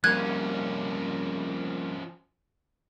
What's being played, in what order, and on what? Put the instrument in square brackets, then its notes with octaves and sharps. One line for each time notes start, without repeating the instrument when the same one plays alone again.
[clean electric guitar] F2 G3 A#3 [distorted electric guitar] F3 C#4 [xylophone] F#6 G#6